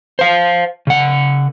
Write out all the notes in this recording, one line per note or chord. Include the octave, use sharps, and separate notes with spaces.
C5 F5
C#3 F#5